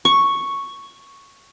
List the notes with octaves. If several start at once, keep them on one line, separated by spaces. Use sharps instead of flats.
C#6